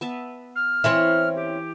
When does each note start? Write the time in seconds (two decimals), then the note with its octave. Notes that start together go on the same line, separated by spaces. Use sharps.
0.01 B3 E5 A5
0.55 F6
0.84 E3 C4 C#4 E4 F5 C#6
1.35 G4